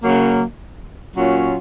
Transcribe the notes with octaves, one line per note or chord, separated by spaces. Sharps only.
C#3 F#3 A#3
A#2 F#3 C#4 F4